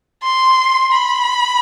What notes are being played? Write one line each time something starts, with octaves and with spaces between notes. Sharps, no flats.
C6
B5